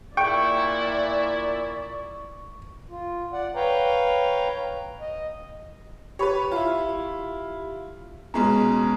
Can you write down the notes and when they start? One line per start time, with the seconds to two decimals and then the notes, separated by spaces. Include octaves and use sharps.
0.17 A#2 E4 D5 G5 C#6
2.90 F4
3.33 D5 F#5
3.55 B4 C#5 F5 G5 A#5
5.01 D#5
6.19 G4 B4 C#5 B5
6.52 E4 F4
8.34 B2 G#3 C#4 A#5